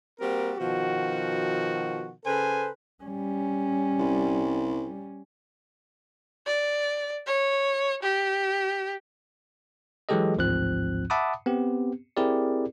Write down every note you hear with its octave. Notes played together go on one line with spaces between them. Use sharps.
G3 A#3 C4 F#4 A#4
B2 D#3 F3 F#4
C#3 A4 B4 C5 G#5
G3 C#4
C2
D5
C#5
G4
E3 F#3 G#3 G4 A4 D#5
A1 D2 G#2 F3 C4 F#6
E5 F#5 A5 B5 D6 D#6
B3 C4 G4
C4 E4 G4 G#4 A#4 D5